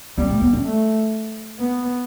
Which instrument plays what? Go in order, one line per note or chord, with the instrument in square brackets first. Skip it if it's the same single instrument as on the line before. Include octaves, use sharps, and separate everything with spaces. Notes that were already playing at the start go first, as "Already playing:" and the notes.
[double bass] G3 [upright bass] C#4
[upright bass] A3
B3
C#4
[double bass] A3
B3